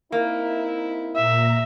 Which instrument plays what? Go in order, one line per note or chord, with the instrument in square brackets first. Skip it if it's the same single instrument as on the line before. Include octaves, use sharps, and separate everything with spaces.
[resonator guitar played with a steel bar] A#3 [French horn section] C4 D#4 E4
[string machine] A#2 A#5 [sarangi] E5